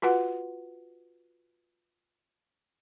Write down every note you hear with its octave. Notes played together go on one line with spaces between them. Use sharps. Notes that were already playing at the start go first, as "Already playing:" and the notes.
F4 F#4 B4 F#5